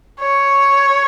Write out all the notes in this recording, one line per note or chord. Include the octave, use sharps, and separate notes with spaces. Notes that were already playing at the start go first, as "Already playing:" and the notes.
C#5